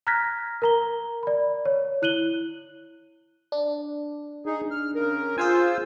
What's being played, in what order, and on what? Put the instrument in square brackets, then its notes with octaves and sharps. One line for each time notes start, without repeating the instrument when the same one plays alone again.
[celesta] A#5 F6 F#6 G#6 A#6 B6
A#4 A#5 G7
D5 B5
C#5
E4 F#6 D#7 F#7 G7
[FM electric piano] D4
[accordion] D#4 G#4
F6
C#3 A#4
[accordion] F4 C5 E6 [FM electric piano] G#4 F5 G#5